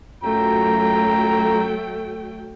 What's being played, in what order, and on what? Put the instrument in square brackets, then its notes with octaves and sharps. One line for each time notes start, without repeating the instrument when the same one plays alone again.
[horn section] F#2 F4 A#5 [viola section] F#3 A3 G5